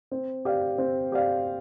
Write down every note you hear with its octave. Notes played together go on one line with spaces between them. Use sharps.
C4
G4 D5 F5
C4
G4 D5 F5